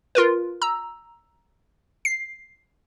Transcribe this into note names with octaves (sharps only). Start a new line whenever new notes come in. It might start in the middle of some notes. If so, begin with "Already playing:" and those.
F4 A#4 B4
A#5 E6
C7